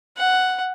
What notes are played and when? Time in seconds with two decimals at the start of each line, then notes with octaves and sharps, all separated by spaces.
0.17 F#5